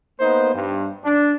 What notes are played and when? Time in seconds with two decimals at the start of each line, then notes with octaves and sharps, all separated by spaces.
0.20 A#3 B3 D#4 C5
0.54 G2
1.05 D4